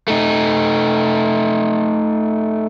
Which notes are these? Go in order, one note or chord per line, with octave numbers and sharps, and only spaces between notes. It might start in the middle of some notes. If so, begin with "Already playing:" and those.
A3 D#4